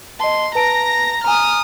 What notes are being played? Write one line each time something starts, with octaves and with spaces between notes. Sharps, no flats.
D#5 A5 C6
B4 A5 A#5 A#6 D7
G#5 A#5 D#6 F6